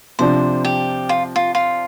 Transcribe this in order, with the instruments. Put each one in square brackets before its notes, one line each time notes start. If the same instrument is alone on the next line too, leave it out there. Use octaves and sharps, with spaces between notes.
[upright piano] C3 F3 D4 [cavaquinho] C5
[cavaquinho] G4
F4
F4
F4